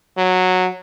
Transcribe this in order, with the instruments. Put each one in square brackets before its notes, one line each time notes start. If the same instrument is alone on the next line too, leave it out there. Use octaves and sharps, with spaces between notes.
[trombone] F#3